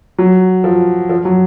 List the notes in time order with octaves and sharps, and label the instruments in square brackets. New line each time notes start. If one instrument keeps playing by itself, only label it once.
[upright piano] F#3
F3
F3
F#3